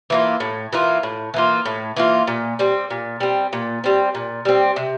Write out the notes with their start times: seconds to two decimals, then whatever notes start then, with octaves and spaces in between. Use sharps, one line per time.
0.10 E3 A#3 F4
0.40 A2
0.73 E3 A#3 F4
1.03 A2
1.34 E3 A#3 F4
1.65 A2
1.96 E3 A#3 F4
2.27 A#2
2.59 G3 C4
2.90 A#2
3.20 G3 C4
3.53 A#2
3.84 G3 C4
4.15 A#2
4.45 G3 C4
4.76 C3